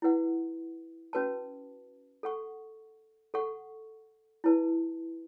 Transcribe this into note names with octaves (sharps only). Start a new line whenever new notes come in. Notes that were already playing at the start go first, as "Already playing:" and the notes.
E4 B4 F#5
C#4 F#4 B4 A5
A4 F#5 C#6
A4 F#5 C#6
E4 B4 A5